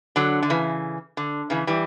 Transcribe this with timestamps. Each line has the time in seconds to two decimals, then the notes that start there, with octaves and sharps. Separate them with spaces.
0.16 D3 F#3
0.42 D3
0.50 C#3 E3
1.17 D3
1.50 C#3 E3
1.67 E3 G3